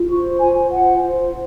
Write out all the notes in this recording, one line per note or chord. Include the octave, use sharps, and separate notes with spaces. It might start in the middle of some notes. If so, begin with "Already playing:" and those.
Already playing: F4
C5 C#6
F4 G#5
C5 F#5
F4